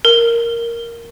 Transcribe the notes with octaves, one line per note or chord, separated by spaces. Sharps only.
A#4